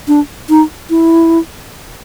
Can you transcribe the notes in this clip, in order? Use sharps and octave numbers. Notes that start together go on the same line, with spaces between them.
D4
D#4
E4